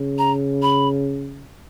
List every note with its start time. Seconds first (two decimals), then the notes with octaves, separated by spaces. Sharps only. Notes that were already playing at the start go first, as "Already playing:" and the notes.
Already playing: C#3
0.18 A#5
0.62 B5